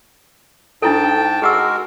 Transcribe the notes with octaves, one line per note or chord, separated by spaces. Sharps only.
G#2 D4 E4 A4 G5 A5
G#3 F#4 G#4 A#4 F#5 E6